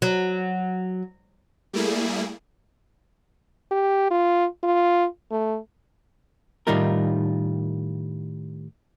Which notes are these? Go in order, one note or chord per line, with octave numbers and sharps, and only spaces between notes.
F#3
G3 A3 A#3 E4 G#4
G4
F4
F4
A3
A2 D#3 G3 D#4 F4 A#4